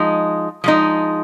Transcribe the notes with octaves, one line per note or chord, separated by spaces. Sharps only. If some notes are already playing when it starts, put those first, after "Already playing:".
Already playing: F3 G#3 D#4
F3 G#3 D#4